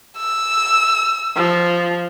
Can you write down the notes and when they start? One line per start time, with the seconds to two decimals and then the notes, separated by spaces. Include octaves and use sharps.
0.18 E6
1.36 F3